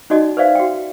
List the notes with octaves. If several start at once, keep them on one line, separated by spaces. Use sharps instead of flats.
C#4 D#4 F#4 D5 D#5
B4 C5 D5 E5 F5
F#4 G5